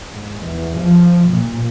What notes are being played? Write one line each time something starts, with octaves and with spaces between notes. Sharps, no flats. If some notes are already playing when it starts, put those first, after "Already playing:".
G#2
E2
F3
A#2